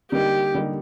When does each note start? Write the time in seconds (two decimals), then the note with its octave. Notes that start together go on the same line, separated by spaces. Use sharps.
0.12 D3 G3 A#3 D#4 G4
0.54 D3 G3 A#3 D#4